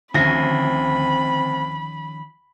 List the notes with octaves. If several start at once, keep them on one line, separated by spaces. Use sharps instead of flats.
D2 D#3 F3 C4 C#4 B5 A#6